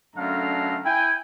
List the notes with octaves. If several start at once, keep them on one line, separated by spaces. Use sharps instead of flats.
F#2 D3 A3 D4 F5 A#5
E4 G5 G#5